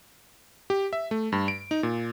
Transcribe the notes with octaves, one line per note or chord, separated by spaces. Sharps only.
G4
E5
A3
G2
D7
D#4
A#2